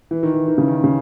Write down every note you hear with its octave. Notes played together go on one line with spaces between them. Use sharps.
E3
D#3
E3
D#3
C#3
D#3
C#3